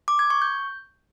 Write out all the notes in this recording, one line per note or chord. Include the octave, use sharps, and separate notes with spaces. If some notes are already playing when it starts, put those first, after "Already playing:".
D6
G#6
C#6
G6